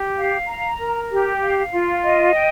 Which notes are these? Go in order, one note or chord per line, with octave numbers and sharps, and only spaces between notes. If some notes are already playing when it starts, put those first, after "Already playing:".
Already playing: G4
F5
A#5
A#4
G4
F5
F4
D#5
G5